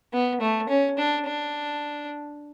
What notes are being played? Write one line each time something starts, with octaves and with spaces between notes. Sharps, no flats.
B3
A3
C#4
D4
D4